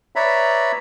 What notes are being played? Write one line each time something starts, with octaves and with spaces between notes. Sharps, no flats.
B4 C#5 D5 E5 A#5 B5